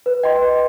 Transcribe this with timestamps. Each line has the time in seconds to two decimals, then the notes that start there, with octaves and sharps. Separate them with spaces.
0.06 B4
0.23 D#5 G5 C6
0.42 B4